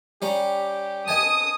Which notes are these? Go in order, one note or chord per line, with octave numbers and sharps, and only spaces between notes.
G3 C#4 G4 A#5
D#5 G#5 A5 D#6